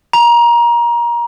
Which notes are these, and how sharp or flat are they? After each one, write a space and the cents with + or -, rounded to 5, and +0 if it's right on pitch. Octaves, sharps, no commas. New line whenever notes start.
A#5 +25